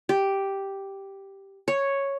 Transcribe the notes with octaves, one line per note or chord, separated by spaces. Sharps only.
G4
C#5